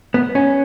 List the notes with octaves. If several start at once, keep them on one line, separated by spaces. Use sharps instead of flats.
B3
C#4